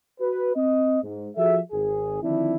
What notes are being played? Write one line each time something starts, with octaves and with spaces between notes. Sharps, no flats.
F#4 B4
C4 D#5
G#2
F3 F#4 G#4 A4 E5
G#1 G#4
D3 D#3 F3 C4 D4 E4